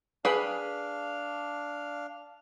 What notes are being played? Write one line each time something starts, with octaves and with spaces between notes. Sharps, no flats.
D4 G#4 B4 F5 G5